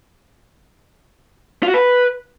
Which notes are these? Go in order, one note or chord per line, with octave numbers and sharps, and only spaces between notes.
F4
F#4
B4